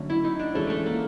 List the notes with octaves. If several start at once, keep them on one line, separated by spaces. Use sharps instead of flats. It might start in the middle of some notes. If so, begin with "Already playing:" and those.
Already playing: D3 F#3 A3 C#4
E4
D#4
D4
E3 G#3 A3 C#4
A3
A#3